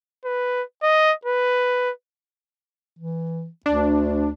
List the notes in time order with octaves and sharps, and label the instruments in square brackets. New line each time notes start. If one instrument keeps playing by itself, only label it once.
[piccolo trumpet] B4
D#5
B4
[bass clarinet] E3
[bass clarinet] D2 [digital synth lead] D4